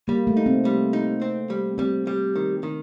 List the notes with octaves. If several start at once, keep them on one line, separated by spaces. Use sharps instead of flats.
G3 A#3
A3
D#4
C4
G3
D#4
C4
G3
G3 C4
G3
D#3
D#3